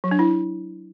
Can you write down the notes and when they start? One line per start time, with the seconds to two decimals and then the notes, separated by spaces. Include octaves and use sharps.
0.04 F#3
0.11 D4
0.19 E4